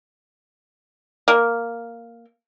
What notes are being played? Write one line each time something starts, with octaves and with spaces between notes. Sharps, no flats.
A#3